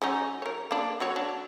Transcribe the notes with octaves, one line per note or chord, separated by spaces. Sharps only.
F#3 C#4 D#4
A#4 C#5
A#3 D4
F#3 F#4 C#5
D4